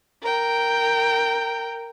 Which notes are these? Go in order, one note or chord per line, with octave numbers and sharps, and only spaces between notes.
A#4 G5